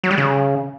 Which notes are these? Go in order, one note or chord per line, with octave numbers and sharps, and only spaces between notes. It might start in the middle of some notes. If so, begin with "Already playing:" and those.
F#3
G3
C#3